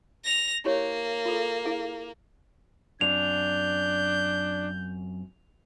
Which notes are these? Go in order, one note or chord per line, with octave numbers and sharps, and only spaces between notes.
A#6 F7
A#3 E4 G4 C#5
F4 A4
E4 G#4 F5
F#2 C4 D4 C5 G6 F7